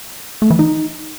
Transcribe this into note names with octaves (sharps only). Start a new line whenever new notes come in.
A3
E3
D#4